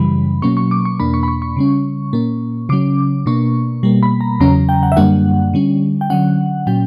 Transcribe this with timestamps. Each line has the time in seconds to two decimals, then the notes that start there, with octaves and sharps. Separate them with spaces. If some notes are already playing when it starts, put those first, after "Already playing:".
Already playing: F#2 C#3 E3 G3 B5
0.42 B2 F#3 A#3 C#4 C#6
0.57 C#6
0.71 D6
0.85 C#6
1.00 E2 B2 A#3 D4 B5
1.14 C#6
1.23 B5
1.28 C#6
1.42 C#6
1.57 C#3 G3 C#4
2.13 A#2 A#3 C#4
2.69 C#3 F#3 C#4 D6
3.26 B2 A#3 D4 C#6
3.83 B2 G3 A#3
4.03 B5
4.21 A#5
4.40 E2 C#3 F#3 C#4 A#5
4.69 G5
4.83 F#5
4.92 E5
4.96 F#2 D3 G3 A#3 D4 F#5
5.54 D3 G3 C#4
6.01 G5
6.10 D3 F#3 C#4 F#5
6.67 A#2 F#3 C#4 G5